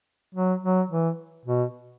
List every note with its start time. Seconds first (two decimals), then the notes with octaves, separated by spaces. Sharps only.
0.35 F#3
0.63 F#3
0.90 E3
1.45 B2